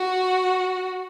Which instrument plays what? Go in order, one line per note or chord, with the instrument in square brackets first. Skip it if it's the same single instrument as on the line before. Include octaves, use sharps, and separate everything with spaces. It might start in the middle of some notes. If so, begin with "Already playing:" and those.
Already playing: [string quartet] F#4